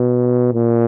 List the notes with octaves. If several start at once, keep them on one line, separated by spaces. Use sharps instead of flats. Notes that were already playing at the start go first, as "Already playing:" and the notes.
Already playing: B2
A#2